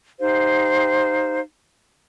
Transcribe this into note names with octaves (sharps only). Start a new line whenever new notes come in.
D#4 G4 C5 F5